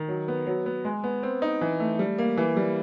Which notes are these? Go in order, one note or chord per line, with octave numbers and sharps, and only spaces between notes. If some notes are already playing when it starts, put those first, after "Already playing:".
Already playing: D#3
F#3
B3
F#3
B3
G#3
B3
C4
D#4
E3
A3
G3
A#3
E3
G3